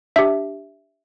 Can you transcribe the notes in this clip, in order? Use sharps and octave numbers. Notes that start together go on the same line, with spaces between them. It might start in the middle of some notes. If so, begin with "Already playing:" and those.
D4 G4 E5